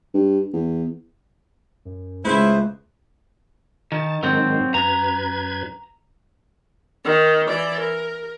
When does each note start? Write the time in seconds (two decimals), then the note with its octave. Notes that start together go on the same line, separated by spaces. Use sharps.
0.14 G2
0.54 E2
1.85 F#2
2.25 C#2 C#3 A3 E4 B4 C5
3.92 D#3 A5
4.23 G#2 D#3 F#3 C4
4.74 F#2 B4 A#5 G#6
7.05 D#3
7.48 E3 D5
7.81 A#4